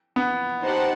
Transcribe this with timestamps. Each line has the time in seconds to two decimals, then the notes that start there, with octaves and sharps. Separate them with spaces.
0.16 B3
0.63 D#4 G4 C5 F#5 A5